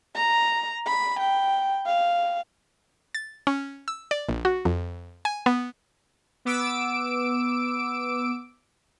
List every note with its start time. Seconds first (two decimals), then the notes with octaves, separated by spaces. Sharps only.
0.15 A#5
0.87 B5
1.20 G5
1.86 F5
3.15 A6
3.47 C#4
3.88 E6
4.11 D5
4.29 A#1
4.45 F#4
4.65 F2
5.25 G#5
5.46 B3
6.45 B3 D6 E6 D7